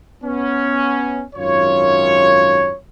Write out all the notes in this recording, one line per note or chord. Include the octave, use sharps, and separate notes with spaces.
B3 C#4
G#1 F#2 F4 C#5